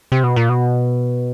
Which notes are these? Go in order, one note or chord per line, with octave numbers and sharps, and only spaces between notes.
C3
B2
A#2
B2